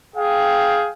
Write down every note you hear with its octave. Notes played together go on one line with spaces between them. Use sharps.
G#4 F5 G5